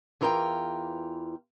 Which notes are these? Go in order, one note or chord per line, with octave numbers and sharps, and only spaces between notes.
E2 E3 F4 A#4 C#5 G5